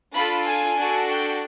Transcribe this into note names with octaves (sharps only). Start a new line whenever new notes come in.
D4 F4 A4 B5
G#5
D4 F#4 A4
G5